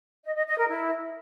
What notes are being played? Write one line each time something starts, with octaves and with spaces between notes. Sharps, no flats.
D#5
D#5
D#5
A#4
E4